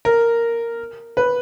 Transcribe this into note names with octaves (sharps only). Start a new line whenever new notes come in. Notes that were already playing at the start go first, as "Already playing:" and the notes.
A#4
B4